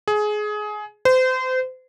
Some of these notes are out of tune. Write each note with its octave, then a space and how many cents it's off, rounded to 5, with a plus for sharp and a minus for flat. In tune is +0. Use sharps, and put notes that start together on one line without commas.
G#4 +20
C5 -30